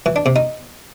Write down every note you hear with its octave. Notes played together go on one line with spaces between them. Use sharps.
E3
D4
C3
D#4